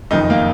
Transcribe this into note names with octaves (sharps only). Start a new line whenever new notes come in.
F#1 F2 D#3 D#4
A#3